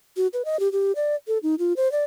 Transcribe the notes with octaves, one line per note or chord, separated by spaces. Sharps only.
F#4
B4
D#5
G4
G4
D5
A4
D#4
F4
C5
D5